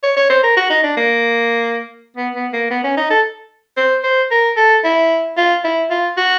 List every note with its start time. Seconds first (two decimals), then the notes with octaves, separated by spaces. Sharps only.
0.03 C#5
0.17 C#5
0.30 C5
0.44 A#4
0.57 F#4
0.70 D#4
0.83 D4
0.97 A#3
2.17 B3
2.35 B3
2.53 A#3
2.71 B3
2.84 C#4
2.97 D#4
3.10 A4
3.77 C5
4.04 C5
4.31 A#4
4.57 A4
4.84 E4
5.37 F4
5.64 E4
5.91 F4
6.18 F#4